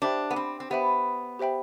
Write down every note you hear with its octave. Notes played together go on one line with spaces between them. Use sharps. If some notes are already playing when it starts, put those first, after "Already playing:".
D4 G4 C5 E5 G5 B5
B3
C4
C4
B3 G4 C5 E5 G5 B5
G4 C5 E5 G5 B5